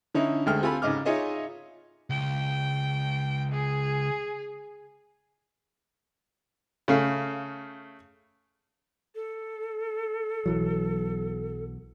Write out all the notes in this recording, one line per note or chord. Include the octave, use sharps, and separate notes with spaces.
D3 C#4 D#4 E4
D2 D3 G#3 A3 G5 F6
C4 F4 G4 A4 G#5 B5
G#2 C#3 D#5 D6 F6
D#4 F4 G#4 C#5 D#5 E5
C#2 G5
G#4
C#3 A3 F5
A4
B1 E3 F#3